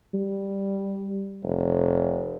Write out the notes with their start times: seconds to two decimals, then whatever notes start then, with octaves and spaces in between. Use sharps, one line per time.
0.14 G3
1.43 F1